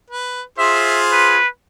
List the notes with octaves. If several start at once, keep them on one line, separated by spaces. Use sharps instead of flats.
B4
F4 G#4 C5 E5
B4